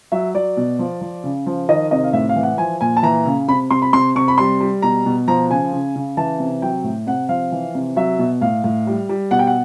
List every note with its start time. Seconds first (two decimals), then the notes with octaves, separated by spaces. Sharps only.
0.12 F#3 E5
0.34 F#3 D5
0.57 B2
0.79 F3
1.01 F3
1.24 C#3
1.46 F3
1.69 D#3 D#5
1.91 C3 D#5
2.04 F5
2.13 A2 E5
2.29 F5
2.36 E3
2.43 F#5
2.58 F3 G#5
2.81 A#2 G#5
2.97 A5
3.03 E3 A#5
3.26 C#3
3.48 C3 B5
3.71 C3 C6
3.82 B5
3.93 C3 C6
4.15 C3 C#6
4.28 B5
4.38 G3 C6
4.61 G3
4.82 B2 A#5
5.06 B2
5.28 F3 A#5
5.50 C#3 G#5
5.73 C#3
5.96 C#3
6.17 E3 A5
6.40 C3
6.62 F#3 G5
6.84 A2
7.07 C3 F#5
7.29 F3 F5
7.52 E3
7.75 C3
7.96 F#3 E5
8.19 B2
8.41 A2 F5
8.64 A2
8.87 G3
9.09 G3
9.31 B2 F#5
9.39 G5
9.47 F#5